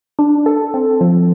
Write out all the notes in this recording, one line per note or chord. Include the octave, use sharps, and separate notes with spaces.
D4
A4
C4
F3